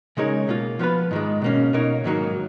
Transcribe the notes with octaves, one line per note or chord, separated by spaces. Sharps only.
C#3 G#3 D#4 A#4 C#5
B2 A#3 F4
F3 B3 F4 B4
G#2 D#3 G#3
B2 A#3 C#4
B2 A#3 D#4 A#4 C#5
G#2 D#3 F#3 A#3 D#4